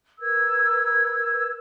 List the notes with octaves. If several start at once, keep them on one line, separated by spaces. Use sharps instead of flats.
A#4 B4 E6 G#6